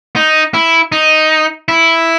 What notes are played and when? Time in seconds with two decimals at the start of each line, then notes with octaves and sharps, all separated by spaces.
0.16 D#4
0.54 E4
0.92 D#4
1.68 E4